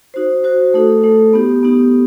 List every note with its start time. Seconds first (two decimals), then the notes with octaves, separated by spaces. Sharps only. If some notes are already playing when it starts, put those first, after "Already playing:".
0.14 D#4 F#4 C5
0.44 D#4 F#4 C5
0.74 A3 D#4 A4
1.03 A3 D#4 A4
1.33 B3 D#4 G4
1.63 B3 D#4 G4